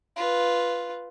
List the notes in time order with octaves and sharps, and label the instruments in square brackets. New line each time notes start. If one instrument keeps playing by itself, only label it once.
[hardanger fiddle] F4 B4